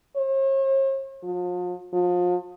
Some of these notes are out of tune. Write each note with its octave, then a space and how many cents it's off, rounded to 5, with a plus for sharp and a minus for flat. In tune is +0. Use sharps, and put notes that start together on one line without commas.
C#5 -45
F3 +40
F3 +35